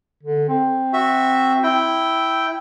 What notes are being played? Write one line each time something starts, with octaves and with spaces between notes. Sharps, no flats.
D3
C4
F#4 E5
E4 G5